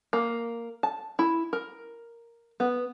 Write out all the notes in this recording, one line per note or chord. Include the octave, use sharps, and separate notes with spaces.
A#3
A5
E4
A#4
B3